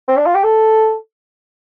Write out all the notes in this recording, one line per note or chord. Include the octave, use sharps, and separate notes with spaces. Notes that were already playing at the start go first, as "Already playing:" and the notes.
C4
D4
F4
G4
A4